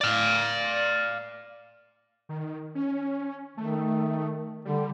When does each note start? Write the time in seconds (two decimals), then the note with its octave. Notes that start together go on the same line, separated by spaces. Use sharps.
0.01 D5 F5
2.29 D#3
2.75 C#4
3.57 D#3 A3
4.65 D3 G3